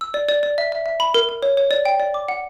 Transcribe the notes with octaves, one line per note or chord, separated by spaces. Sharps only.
E6
D5
D5
D5
E5
E5
E5
B5
A#4
A#4
C#5
C#5
D5
G5
D5
D6
F#5